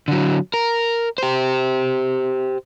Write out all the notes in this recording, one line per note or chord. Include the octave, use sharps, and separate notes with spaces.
D3 F#3
A#4
G4 C5